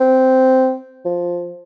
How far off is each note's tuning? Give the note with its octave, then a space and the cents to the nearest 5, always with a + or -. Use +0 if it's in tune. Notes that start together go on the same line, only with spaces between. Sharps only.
C4 -10
F3 +5